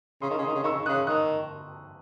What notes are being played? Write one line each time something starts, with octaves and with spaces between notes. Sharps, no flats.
C#3 C6 D#6
D#3
C#3
D#3 C6 D#6
C#3
D#3 C#6 E6
C#3
D#3
C#3 D#6 F#6
D#3 D#6 F#6